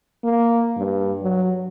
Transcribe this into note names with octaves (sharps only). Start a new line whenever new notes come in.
A#3
G2
F#3